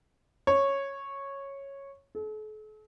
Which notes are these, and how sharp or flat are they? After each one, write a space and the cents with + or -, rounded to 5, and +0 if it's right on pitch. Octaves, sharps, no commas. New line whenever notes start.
C#5 -10
A4 -45